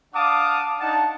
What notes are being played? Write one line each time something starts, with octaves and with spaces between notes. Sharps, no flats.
D4 F5 F#5 A5 D6 D#6
D4 D#4 F#5 A5